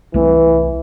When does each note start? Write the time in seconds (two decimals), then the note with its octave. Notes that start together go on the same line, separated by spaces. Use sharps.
0.14 C2 E3 A3 C4